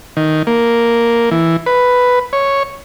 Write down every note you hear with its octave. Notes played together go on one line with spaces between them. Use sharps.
D#3
A#3
E3
B4
C#5